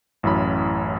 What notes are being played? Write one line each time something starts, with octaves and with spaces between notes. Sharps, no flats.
A1 F#2 E4 B5